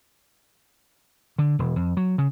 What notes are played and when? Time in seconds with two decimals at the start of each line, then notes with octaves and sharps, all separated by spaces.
1.38 D3
1.59 E1
1.76 F2
1.97 F#3
2.18 C#3